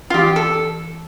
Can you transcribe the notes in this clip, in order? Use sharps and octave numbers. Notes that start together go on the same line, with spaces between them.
F4
E3 G4
A4